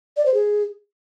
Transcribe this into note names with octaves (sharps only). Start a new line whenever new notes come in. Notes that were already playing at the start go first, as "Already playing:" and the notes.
D5
C5
G#4